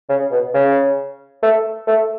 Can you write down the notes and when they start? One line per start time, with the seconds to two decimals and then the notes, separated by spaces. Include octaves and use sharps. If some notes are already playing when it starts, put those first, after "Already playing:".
0.09 C#3
0.32 B2
0.54 C#3
1.43 A3
1.87 A3